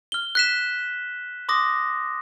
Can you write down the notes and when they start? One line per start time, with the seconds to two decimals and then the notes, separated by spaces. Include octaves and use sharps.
0.12 F6 G7
0.35 F#6 B6 E7
1.49 C6 D6 D#6 A#6